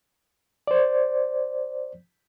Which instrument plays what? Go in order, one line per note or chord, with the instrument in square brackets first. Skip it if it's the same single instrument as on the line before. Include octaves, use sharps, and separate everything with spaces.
[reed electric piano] C5 D5